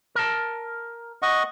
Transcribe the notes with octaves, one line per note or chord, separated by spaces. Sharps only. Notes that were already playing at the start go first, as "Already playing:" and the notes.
A#4 A5
D#5 F#5 C#6